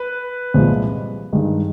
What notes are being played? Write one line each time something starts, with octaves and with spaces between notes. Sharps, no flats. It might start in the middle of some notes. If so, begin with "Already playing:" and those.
Already playing: B4
C2 A#2 F3 G#3
G2 D#3 G#3